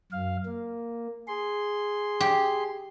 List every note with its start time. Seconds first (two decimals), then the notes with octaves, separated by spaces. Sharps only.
0.12 F#2 F5
0.46 A#3
1.28 G#4 C6
2.20 G4